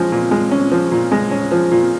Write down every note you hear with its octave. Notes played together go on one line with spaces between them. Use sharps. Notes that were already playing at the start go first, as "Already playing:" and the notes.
Already playing: F3 G#3 C#4
A#2
G#3
C#4
F3
A#2
G#3
C#4
F3
A#2